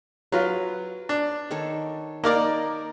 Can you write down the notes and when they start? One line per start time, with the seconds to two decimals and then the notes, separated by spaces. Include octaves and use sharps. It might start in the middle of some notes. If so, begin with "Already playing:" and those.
0.32 F#3 F4 B4
1.09 D4
1.51 D#3 A4 C#5
2.24 A#3 D#4 A#4 D5 A#5